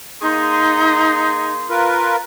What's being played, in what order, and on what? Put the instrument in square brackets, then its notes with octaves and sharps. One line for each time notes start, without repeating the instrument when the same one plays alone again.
[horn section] A#3 G#4 C6 [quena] D#4
[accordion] F4 A#4 B4